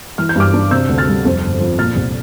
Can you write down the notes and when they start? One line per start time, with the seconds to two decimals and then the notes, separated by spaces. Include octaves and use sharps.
0.18 E3 F6
0.29 G6
0.36 G2 D6 F6
0.54 D4
0.71 C3 E6 G6
0.89 D2
0.98 F6 A6
1.08 G3
1.25 F2
1.42 G1
1.60 F3
1.79 A#2 F6 A6
1.96 C2